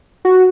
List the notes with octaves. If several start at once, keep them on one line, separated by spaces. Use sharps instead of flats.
F#4